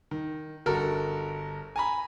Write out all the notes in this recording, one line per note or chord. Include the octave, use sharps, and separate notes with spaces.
D#3
G1 F#4 A4 A#4
G#5 A#5 B5